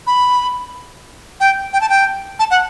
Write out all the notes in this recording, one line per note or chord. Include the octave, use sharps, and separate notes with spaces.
B5
G5
G5
A5
G5
A5
F#5